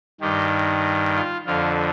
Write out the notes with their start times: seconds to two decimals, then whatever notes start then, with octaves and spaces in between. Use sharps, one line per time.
0.21 G2 D#3 G4
1.15 F4
1.46 F2 D3 F4